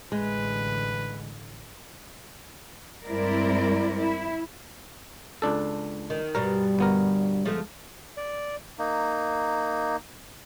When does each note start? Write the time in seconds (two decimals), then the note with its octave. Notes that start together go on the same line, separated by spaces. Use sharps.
0.12 A1 D3 G#3 B4
3.06 G2 G#3 C4 E4 A#4 D5
3.99 E4
5.42 C#2 D4 A4
6.10 D#3
6.35 G2 B2 G3 A#4
6.79 G1 B3 A#4
7.45 F3 G#3 A3
8.17 D5
8.79 A#3 D#4